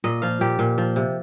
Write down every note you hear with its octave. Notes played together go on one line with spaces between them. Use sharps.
A#2 D#5
F3 F5
A#2 G4
A#2
F3
C3